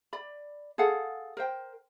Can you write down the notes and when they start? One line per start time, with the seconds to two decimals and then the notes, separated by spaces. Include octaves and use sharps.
0.13 D5 B5
0.78 G#4 A4 F5 F#5
1.37 A#4 C5 G5